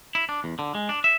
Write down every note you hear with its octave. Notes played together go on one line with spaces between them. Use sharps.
E4
D4
E2
D3
G#3
D4
E5